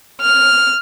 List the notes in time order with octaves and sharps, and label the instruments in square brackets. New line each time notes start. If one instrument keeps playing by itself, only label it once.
[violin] F6